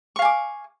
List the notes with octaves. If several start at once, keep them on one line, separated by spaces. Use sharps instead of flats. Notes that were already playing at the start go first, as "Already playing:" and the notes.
F5 G#5 C#6 D6